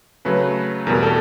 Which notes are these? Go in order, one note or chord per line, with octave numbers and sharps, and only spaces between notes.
C#3 F#3 A3 B4
E2 B2 G3 A#4
A4